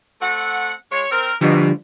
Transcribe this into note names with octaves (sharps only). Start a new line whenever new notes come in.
A3 C4 F#5
G#3 F4 C#5
C4 A#4
G#2 B2 D3 F3 G3